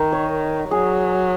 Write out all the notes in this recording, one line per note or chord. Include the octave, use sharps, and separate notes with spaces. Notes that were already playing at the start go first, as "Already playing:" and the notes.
Already playing: D#3 A#4
C#5
F#3 G#4